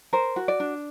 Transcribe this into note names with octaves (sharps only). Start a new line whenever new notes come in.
A#4 C5
F#4
D5
D4